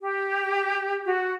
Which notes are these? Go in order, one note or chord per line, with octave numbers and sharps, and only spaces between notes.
G4
F#4